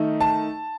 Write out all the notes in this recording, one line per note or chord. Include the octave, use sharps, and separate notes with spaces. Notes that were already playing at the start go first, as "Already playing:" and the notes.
Already playing: D#3 A3 D#4
A5